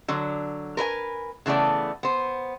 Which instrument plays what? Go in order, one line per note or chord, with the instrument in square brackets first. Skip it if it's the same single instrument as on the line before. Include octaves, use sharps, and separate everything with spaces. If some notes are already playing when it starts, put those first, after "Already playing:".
[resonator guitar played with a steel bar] D3 F#3
A#4 B4 D5 G#5
C#3 E3 A3 B3 D5
B3 C5